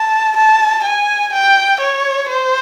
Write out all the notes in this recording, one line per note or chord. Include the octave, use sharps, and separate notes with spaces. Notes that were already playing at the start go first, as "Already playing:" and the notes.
Already playing: A5
A5
G#5
G5
C#5
C5